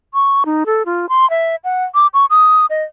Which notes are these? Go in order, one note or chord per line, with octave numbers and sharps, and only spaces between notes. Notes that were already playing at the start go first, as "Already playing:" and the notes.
C#6
D#4
A4
F4
C6
E5
F#5
D6
C#6
D#6
D#5